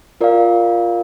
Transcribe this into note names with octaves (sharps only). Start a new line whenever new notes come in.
F4 A#4 D5 F5